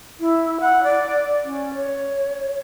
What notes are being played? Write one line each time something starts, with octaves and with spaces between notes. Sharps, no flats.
E4
F#5
D5
C#4
C#5